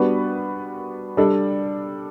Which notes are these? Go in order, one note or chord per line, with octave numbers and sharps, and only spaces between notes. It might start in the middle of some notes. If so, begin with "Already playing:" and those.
Already playing: G3 B3 D4 F#4 B4
G3 D4 A4 D5